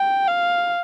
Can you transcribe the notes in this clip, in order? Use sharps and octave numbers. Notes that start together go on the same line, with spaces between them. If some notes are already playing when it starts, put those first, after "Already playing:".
Already playing: G5
F5